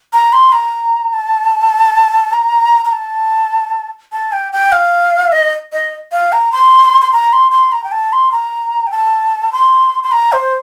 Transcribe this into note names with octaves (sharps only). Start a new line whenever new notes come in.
A#5
C6
A#5
A5
A#5
A#5
A5
A5
G5
G5
F5
D#5
D#5
F5
A#5
C6
C6
A#5
C6
C6
A#5
G5
A5
C6
A#5
G5
A5
C6
C6
A#5
C5